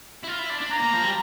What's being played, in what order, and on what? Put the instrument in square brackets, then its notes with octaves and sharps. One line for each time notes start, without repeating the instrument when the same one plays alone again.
[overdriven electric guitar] E4
F4
E4
D4
D4
[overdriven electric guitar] A#3 [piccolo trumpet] A#5
[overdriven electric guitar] A#3
F3
G3